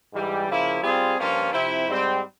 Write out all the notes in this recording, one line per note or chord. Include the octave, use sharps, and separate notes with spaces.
G#2 E3 G3
C#3 F3 A#3 E4
G3 C4 F4 G#4
G2 F3 A#3 C#4 F4
C3 F3 C4 E4
G#2 G3 C4